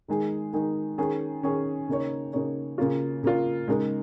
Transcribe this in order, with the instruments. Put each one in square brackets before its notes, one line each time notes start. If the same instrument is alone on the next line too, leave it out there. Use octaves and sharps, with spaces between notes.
[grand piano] D#3 G#3 D#4 G#4
D#3 G#3 D#4 G#4
D#3 C#4 G#4
D#3 C#4 G#4
C#3 A#3 D#4 C#5
C#3 A#3 D#4 C#5
C#3 A#3 F4
C#3 A#3 F4
C#3 G#3 D#4 A#4